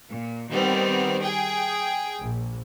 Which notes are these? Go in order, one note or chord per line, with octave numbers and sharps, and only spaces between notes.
A#2
D#3 G3 B3 C4
G#4 G5
A#1